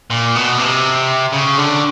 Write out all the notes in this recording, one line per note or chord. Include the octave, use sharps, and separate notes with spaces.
A#2
B2
C3
C#3
D3